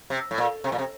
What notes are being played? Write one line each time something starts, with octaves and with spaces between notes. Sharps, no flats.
C3
A2
A#2
C3
A#2
C3